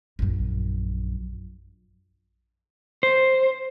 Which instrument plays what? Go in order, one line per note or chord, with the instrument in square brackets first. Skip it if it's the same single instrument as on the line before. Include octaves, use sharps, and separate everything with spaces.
[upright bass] A#1 F#2
[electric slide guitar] C5